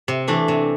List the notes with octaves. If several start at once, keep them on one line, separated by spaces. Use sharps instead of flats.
C3
E3 A3 D4
C3